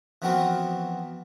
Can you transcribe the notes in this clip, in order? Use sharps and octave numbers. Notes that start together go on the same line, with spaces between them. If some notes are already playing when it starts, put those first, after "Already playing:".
E3 F3 B3 C4 F#4 A#4